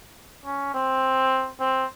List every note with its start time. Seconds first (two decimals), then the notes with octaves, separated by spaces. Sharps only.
0.45 C#4
0.74 C4
1.60 C4